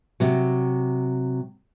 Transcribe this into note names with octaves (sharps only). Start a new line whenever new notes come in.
C3 F#3